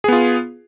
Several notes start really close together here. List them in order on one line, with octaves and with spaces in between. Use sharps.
G#4 B3 F4